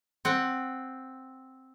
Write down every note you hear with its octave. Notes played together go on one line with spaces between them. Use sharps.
C4 F#5